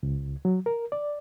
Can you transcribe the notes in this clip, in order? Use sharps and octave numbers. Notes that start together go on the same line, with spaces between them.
C#2
F#3
A#4
D5